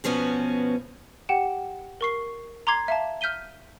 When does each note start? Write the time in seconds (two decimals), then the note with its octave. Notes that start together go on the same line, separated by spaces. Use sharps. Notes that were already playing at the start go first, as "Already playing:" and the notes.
0.04 B2 F3 B3 C#4 F#4
1.29 G4 F#5 G5 E7
2.01 A#4 C#6 C7
2.67 A#5 C6 D6 G#6 C7
2.88 E5 F5 A5
3.21 F6 G6 B6 D#7 G7